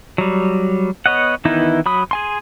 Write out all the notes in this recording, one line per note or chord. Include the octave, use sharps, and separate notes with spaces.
F#3 G3
B3 C#5 D#5 F#5
D#3 E3 B3 D#4 E4
F#3 B5 D#6
G#4 G#5 C6